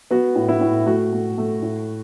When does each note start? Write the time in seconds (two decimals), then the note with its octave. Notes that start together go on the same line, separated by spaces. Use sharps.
0.11 B3 F#4
0.35 A2
0.49 E4
0.61 A2
0.86 A3 F#4
1.13 A3
1.38 A3
1.62 A2